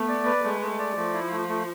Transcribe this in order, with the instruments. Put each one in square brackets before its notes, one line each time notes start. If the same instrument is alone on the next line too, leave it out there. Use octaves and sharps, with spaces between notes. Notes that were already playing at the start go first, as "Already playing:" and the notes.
Already playing: [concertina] A3 [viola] B3
[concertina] D5
B4
[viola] G#3 [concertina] A3
[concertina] A3
D5
[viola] F3 [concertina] A3
[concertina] E4
A3
A3